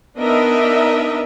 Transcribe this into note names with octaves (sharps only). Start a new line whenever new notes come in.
B3 D4 D#4 A#4 D#5 E5